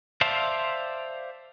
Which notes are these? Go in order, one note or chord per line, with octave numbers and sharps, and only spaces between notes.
C5 D5 E5 F5 A5